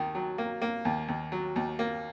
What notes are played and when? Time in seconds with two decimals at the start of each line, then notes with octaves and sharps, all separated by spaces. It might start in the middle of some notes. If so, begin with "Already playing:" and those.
Already playing: D#2 D#3
0.15 F#3
0.38 A#3
0.62 A#3
0.85 D#2
1.08 D#2
1.32 F#3
1.56 D#2
1.79 A#3